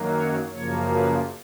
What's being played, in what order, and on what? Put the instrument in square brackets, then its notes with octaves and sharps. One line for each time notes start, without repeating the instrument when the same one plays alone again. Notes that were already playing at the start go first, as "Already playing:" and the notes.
Already playing: [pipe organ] F#2 D#3 F#3 A#3
C#5
F#2 C#3 F3 A#3 C#5
B4